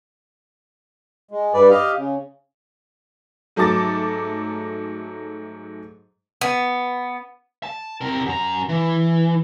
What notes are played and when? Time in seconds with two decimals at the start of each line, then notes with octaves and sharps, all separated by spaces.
1.31 G#3
1.54 G2 G3 B4 D5
1.70 G4 D#5 F5
1.97 C#3
3.56 G#2 F#3 A3 A5 D6 A6
6.41 B3
7.63 A5
8.01 C3 A#4
8.26 F#2 A#5
8.69 E3